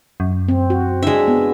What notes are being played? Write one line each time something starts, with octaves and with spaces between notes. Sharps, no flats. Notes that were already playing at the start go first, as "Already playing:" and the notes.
F#2
C4
F#4
G#3 D4 E5
B3